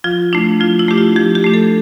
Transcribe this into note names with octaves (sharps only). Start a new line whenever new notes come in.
F3 F4
A3 D4 E4
F3 F4
E4
A3 D4 G4
F4
F3 G4
G4
A3 D4
A4